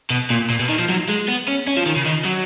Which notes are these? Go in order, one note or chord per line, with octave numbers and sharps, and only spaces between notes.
B2
A#2
A#2
B2
D#3
F3
F#3
G#3
B3
C#4
C#4
F3
D#3
C#3
D#3
F#3